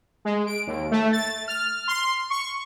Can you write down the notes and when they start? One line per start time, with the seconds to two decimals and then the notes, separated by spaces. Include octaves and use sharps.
0.25 G#3
0.47 D7
0.67 D#2
0.91 A3
1.12 A6
1.48 F6
1.88 C6
2.30 C#6